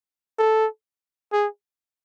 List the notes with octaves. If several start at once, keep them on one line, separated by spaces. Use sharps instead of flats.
A4
G#4